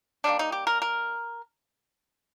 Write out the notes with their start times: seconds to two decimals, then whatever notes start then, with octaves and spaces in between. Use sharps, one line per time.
0.24 D#3 G3 A#3 D4
0.39 D#4
0.52 G4
0.67 A#4
0.82 A#4